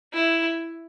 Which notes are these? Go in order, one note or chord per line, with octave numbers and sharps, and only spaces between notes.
E4